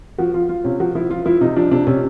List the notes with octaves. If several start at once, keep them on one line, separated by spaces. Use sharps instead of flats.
F3 F#4
F3 F4
F3 F4
C3 C#4
F3 F#4
F3 E4
F3 F4
F3 E4
C3 D#4
F3 D4
C3 D4
C3 C#4